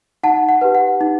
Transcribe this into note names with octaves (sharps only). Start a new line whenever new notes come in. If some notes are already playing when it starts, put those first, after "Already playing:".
D#4 F#5 A5
F#5
G4 B4
F#5
D#4